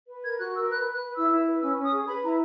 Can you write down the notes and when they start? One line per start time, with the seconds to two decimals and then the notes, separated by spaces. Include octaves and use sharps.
0.09 B4
0.24 A#4 G#6
0.39 F#4 F#6
0.54 A#4 E6
0.69 B4 F#6
0.85 B4
0.92 F#6
1.01 B4
1.15 E4 E6
1.31 E4
1.46 B4
1.61 C#4 E6
1.76 C#4
1.85 D#6
1.92 G#4
2.07 B4 B5
2.22 E4 A#5